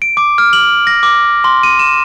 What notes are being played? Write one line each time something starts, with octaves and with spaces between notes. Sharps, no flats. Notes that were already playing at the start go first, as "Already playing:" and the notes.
D7
D6
F6
F#7
A#6
D6
C6
D#7
E7